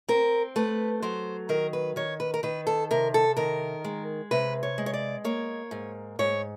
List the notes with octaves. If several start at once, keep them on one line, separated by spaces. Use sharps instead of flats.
C4 A#4
A3 B4
F#3 C5
D#3 A#4
B4
D#3 C#5
B4
A#4
D#3 B4
A4
C3 A#4
A4
D#3 A#4
G#3
C3 B4
C#5
G#3
C#5
D5
A#3 C#5
G#2
G#2 C#5